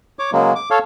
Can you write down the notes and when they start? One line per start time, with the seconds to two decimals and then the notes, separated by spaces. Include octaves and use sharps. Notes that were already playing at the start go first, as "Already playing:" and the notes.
0.19 C#5 D6
0.33 C#3 F#3 G#3 A#3
0.56 D6
0.71 A4 C#5 F5